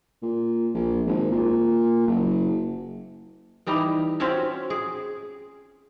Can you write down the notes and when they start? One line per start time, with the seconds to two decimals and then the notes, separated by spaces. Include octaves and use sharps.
0.22 A#2
0.74 A#1
1.06 G#1
1.31 A#2
2.07 F#1
3.67 E3 G3 D#4 E4
4.20 C4 C#4 F4 F#4 C#5 E5
4.70 G#4